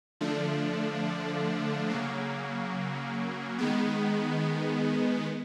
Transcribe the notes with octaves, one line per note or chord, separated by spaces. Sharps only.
D3 F3 A3 D4
C#3 F#3 A#3
D#3 G#3 B3